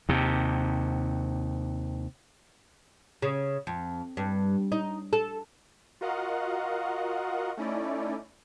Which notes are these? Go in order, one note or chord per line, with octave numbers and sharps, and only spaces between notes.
D#2 C3
C#3
F2
G2
D#4
A4
F4 F#4 A#4 D#5 F5 F#5
A3 C#4 D#4 E4 D5